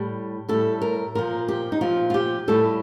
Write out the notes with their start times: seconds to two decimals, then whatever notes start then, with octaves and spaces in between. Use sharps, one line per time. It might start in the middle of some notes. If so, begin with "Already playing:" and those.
Already playing: A2 G3
0.48 A2 G3 A4
0.82 A#4
1.15 A#2 F3 A#4
1.48 G4
1.72 D#4
1.81 A#2 F3 F4
2.10 F4
2.14 G4
2.48 A2 G3 A4